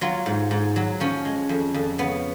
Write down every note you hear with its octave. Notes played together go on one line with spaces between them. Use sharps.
F#3 F4
G#2
G#2
F#3
F3 C#4
G#3
F2
F2
C#3 B3